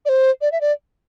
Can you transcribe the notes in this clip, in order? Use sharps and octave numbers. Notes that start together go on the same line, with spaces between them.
D5
C5
D5
E5
D5